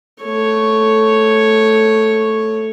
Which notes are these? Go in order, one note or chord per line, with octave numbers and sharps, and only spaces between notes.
A3 C#5